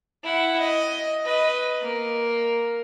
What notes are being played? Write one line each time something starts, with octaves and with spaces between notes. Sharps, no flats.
E4 F#5
D#5
B4 D#5
A#3